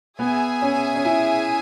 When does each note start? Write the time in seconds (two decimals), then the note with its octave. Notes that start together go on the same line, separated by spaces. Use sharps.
0.19 B3 G#4 E5 G#5
0.62 C#4
0.96 C#4
1.05 E4